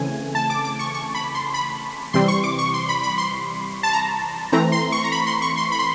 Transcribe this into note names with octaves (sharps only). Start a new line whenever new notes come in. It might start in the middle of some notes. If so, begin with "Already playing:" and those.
Already playing: C#3 E3 A3 C4 G#5
A5
D6
D6
C#6
C#6
B5
C6
B5
C3 E3 G3 C4 C6
C#6
D6
C#6
C6
B5
B5
C6
A5
A#5
E3 A3 C4 A#5
C6
C#6
A#5
B5
C6
C#6
C6
B5
C6